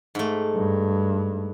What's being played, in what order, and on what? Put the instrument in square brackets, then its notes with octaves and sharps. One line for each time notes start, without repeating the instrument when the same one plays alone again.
[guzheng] G#2 A3
[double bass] G2